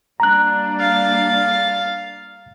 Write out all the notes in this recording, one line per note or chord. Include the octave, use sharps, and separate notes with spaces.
G3 A#3 D4 A#5 F#6
F5 A6